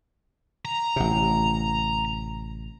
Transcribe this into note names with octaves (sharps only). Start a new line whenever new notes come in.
A#5
A1 C3